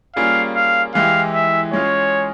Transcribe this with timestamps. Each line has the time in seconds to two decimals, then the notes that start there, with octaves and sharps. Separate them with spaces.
0.16 G3 A#3 C#4 F4 G#4 F5
0.56 F5
0.95 E3 G#3 E4 G4 F5
1.34 E5
1.73 G#3 C#4 F4 G#4 C#5